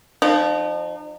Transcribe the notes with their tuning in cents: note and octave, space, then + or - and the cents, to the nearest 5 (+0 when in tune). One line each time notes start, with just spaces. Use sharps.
F3 +0 D#4 -40